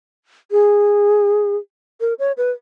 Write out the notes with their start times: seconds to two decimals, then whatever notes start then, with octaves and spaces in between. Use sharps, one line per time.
0.51 G#4
2.00 A#4
2.19 C#5
2.37 B4